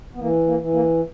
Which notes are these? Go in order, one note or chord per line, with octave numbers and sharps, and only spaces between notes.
B3
E3 A#3
A#3
E3
A#3